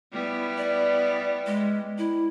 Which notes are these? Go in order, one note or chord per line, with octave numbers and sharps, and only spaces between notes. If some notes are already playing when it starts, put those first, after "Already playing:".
G3 B3 E4
D5
G#3
E4